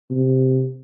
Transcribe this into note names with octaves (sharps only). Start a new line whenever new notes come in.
C3